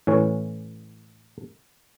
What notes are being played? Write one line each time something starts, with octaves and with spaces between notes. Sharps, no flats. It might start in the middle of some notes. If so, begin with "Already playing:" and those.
A2 E3 C#4 C#5